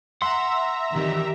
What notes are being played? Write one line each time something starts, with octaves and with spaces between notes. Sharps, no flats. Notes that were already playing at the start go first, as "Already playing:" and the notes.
E5 F#5 A#5 C6
D#3 E3 C4 G4